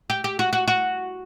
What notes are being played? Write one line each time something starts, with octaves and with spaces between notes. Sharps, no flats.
G4
G4
F#4
F#4
F#4